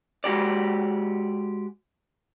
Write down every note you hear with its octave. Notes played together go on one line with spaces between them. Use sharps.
G#3 F#4 G4 D5